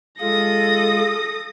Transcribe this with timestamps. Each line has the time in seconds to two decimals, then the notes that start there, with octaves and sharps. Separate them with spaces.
0.20 G#3 F4 A4 D#6 A#6